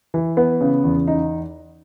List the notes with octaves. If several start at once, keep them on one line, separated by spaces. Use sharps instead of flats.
E3
B3
C#3
E2
D#4